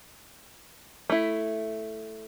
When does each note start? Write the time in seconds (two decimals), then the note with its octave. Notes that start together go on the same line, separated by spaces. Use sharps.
1.10 A3 E4